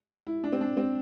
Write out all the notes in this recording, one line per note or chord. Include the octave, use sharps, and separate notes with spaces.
E4
D4
C4
D4
C4